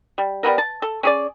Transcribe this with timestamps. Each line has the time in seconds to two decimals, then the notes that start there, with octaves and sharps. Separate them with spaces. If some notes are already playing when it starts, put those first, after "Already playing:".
0.18 G3
0.43 G3 G#3 B3 A#4
0.58 A5
0.82 A4
1.03 C#4 G#4 D5